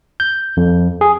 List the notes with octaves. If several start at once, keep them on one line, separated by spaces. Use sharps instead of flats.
G6
F2
G#4